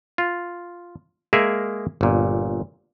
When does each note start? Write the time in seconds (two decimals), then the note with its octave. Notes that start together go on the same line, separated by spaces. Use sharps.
0.18 F4
1.33 G#3 A#3 G#4 A#4 E5
2.01 G1 A#2